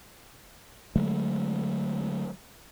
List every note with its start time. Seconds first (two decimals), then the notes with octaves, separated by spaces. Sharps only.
0.96 D3 F#3 G#3 A3